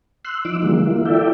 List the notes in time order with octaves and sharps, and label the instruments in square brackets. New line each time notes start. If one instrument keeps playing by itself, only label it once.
[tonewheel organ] C6 E6 F#6
F3 D#4 D6 E6
D3 E3 F3 G3 G#3 A#3
E3 A#3 E4 F4
E4 F4 A4 D5 E5 G5